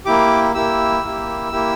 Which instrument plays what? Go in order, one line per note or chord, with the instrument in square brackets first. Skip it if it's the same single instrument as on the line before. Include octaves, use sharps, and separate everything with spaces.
[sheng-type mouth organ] A#3 E4 G4 D6
A#3 E4 G4 E6
A#3 E4 G4
A#3 E4 G4